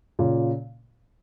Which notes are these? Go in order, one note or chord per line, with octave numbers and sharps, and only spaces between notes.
A#2 C#3